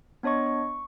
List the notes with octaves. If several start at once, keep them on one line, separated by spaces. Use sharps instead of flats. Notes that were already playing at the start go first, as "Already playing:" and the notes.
B3 D4 C#5 D#5 C#6
C#6